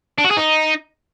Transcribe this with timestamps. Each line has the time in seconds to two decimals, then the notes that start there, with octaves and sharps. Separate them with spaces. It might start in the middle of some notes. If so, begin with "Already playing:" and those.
0.18 D4
0.24 F#4
0.31 G#4
0.37 D#4